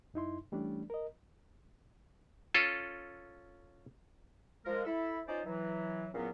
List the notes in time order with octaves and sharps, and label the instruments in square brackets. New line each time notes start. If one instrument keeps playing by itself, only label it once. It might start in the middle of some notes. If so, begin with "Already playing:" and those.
[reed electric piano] F#2 D#4 E4 C6
E3 G3 A3 C#4 D4
A#4 D#5
[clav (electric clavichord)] C#4 F4 A4
[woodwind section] F3 G#3 A#4
E4 A4
C#4 D#4 F4 C5 D5
E3 F#3
E2 A#2 F#3 B3 C#4